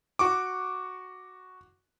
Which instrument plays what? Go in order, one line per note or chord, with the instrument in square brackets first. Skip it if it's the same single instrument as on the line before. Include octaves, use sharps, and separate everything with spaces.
[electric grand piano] F#4 C#6 D6